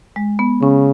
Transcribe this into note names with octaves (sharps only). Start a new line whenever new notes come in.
G#3
B3
C#3 C#4